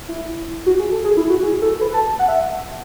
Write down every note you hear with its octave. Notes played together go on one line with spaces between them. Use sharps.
E4
F#4
G#4
A4
G#4
E4
F#4
G#4
A4
B4
A5
F#5
E5